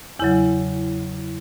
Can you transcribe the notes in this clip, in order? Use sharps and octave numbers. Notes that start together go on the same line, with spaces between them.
E2 C#3 F#3 E4